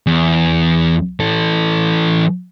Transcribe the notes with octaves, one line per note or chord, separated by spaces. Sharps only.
E2
E3 A4